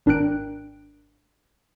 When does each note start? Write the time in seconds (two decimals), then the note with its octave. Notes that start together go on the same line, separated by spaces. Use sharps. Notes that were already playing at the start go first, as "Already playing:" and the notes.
0.06 G#1 D4 A#4 G5 F#6 D7